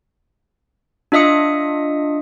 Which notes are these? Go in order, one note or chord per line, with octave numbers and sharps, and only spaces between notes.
D4 F4 D#5 E5 D#6 C#7